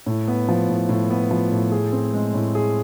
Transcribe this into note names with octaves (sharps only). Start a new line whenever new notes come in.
A2
B3
F3
A2
A2
B3
F3
A2
G#4
C4
G#3
A2
G#4